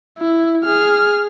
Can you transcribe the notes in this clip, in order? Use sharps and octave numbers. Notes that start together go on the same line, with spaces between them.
E4
G#4 F6